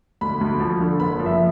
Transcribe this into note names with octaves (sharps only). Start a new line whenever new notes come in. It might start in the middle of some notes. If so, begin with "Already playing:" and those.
D2 B5
D2
F3
D3
F#1 B5
F3
E5